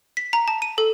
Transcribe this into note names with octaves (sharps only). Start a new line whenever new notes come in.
B6
A#5
A5
D#7
A4